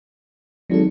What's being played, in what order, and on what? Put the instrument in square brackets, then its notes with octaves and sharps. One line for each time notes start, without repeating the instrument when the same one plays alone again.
[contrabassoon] G#1 [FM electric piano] F#3 E4 A4